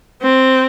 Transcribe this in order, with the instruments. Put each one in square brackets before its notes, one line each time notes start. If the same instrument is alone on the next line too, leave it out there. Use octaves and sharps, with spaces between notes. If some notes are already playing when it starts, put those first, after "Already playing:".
[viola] C4